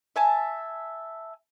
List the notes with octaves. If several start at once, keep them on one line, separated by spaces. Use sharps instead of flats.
E5 G#5 A5